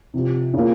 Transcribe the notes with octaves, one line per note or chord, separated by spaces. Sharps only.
C3 F3 C4 G4
C#3 F3 A#3